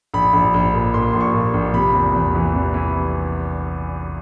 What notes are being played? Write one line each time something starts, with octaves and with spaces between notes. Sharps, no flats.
A#1 B5
A#1
A#1
A#2
A#2 C6
A#1
C#6
A#2
A#1
C3 B5
E2
E2
E3
C3
E3